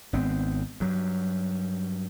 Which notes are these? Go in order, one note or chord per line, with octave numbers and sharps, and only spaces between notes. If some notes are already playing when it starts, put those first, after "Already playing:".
G#1 B3 C4
G2 F#3